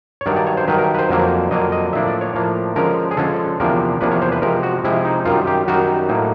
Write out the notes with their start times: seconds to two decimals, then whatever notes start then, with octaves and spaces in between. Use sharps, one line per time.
0.21 C#5
0.26 G2 D#3 F#3 D5
0.36 D5
0.47 C#5
0.57 C5
0.67 G2 D#3 F#3 B4
0.78 A#4
0.94 B4
0.99 C5
1.09 F2 D3 F#3 A#3
1.51 F2 D3 F#3 A#3 D#5
1.72 D#5
1.93 A2 F3 A#3 D4 E5
2.07 D5
2.21 C#5
2.34 A2 F3 A#3 D4
2.76 D3 F3 G#3 C#4 A#4
3.11 G#4
3.17 D3 F3 G#3 C#4 A4
3.60 E2 C3 F3 A#3 D4 A#4
4.01 E2 C3 F3 A#3 D4 B4
4.12 C#5
4.22 C5
4.32 B4
4.42 C3 F3 G#3 A#4
4.63 F#4
4.84 C3 F3 G#3 E4
5.05 D#4
5.25 F#2 D#3 G3 F4
5.47 G4
5.68 F#2 D#3 G3 F#4
6.09 A2 F#3 A#3 D#4